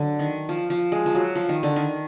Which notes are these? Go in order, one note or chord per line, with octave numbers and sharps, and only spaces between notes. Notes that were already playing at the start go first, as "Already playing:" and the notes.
Already playing: D3 F#3
D#3
F3
F3
G#3
F3
F#3
F3
D#3
D3
D#3